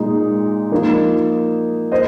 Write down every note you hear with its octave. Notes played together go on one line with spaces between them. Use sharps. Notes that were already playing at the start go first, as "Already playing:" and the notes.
Already playing: A#2 G#3 D#4
F3 A#3 D#4
C5 D#5